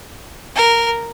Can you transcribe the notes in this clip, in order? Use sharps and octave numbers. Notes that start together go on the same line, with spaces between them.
A#4